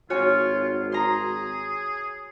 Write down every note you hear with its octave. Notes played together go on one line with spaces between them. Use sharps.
G#1 F4 F#4 C#5 G#5
G#4 A#5 C6